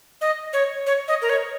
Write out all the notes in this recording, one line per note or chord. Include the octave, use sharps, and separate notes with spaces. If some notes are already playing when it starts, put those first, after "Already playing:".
D#5
C#5
C#5
D#5
A#4
C#5